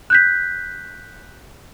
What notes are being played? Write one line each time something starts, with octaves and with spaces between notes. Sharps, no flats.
F#6 G6 B6